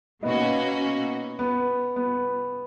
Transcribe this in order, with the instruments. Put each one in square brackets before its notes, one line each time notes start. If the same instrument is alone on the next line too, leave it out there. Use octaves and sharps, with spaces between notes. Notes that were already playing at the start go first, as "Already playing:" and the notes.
[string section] B2 A#3 C#4 F#4 [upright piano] B3 D#4
[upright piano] B3
B3